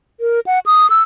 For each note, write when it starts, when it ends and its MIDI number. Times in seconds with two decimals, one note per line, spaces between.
0.20 0.40 70
0.46 0.59 78
0.66 0.89 87
0.90 1.02 88